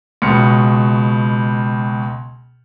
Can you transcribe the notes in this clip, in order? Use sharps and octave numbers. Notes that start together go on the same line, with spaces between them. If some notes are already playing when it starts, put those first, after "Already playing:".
C#2 B2 F6 C#7